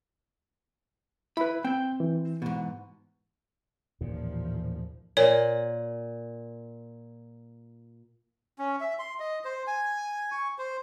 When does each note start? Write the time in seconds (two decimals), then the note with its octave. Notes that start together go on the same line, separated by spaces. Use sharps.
1.37 E4 B4 B5
1.65 C4 G5 G6
2.00 E3
2.42 G#2 B2
4.01 A1 D#2 A#2 F3
5.17 A#2 C#5
8.59 C#4
8.81 E5
8.99 C6
9.20 D#5
9.45 C5
9.67 G#5
10.32 C#6
10.58 C5